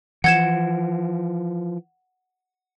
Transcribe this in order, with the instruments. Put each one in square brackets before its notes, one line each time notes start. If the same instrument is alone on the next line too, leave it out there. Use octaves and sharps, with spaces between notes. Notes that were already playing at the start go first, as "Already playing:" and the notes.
[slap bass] E3 F3 [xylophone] F#5 G#6 E7